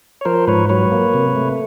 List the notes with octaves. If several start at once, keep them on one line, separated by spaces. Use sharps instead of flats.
C#5
F3 A#4 C5
G#2 B4 C#5
F#3 B4 C#5
A#3
C3
A3